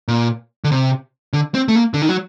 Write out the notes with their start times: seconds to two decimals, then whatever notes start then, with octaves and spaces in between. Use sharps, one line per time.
0.08 A#2
0.64 D3
0.72 C3
1.33 D3
1.54 C4
1.68 A3
1.76 A#3
1.94 D3
2.02 D#3
2.09 F#3